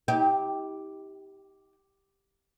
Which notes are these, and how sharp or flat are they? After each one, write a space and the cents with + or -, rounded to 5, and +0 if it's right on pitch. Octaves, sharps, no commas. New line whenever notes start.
D#4 +45 G4 +0